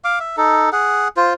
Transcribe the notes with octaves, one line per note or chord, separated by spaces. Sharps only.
F5 D6
E5
D#4 A4
G#4 F#5
F4 C5